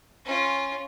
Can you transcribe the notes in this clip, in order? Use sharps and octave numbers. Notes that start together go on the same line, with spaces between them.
C#4 F4